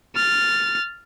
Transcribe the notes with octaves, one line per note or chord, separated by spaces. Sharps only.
F6 A6